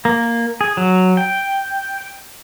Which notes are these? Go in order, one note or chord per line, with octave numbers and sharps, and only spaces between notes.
A#3
G#4
F#3
G5